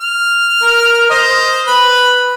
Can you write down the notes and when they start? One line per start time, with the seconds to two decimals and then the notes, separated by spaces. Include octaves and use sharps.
0.01 F6
0.62 A#4
1.10 C5 D#5
1.67 B4 B5